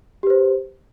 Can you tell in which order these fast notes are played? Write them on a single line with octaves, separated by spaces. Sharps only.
G4 B4 C5